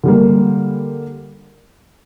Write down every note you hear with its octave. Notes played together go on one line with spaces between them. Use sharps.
D3 G3 A#3